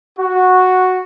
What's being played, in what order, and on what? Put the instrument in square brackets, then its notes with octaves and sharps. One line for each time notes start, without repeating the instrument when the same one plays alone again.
[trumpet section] F#4